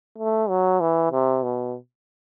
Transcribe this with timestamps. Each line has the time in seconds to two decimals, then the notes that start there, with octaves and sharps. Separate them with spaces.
0.18 A3
0.49 F#3
0.81 E3
1.12 C3
1.43 B2